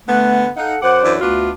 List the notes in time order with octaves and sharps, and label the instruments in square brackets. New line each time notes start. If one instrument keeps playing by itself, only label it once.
[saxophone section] D3 B3 [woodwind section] A3
[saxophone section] D#4 [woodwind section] A4 F5 F#5
[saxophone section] F#2 F#5 [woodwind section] C5 D6
[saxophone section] F#2 E3 D4
[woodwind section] D2 F#4 [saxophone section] B3 D4 F4